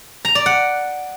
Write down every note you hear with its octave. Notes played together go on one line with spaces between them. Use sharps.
A#5
D5
F#5